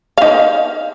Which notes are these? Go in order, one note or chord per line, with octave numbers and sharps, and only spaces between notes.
D#4 F5